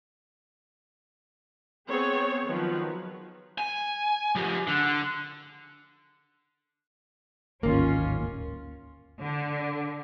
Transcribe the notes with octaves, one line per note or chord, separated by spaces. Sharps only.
B3 C4 G#4 C#5
D#3 F3 F#3 B4
G#5
F3 G4
D3
D1 G#1 D#2 A#3 C#4 F4
D3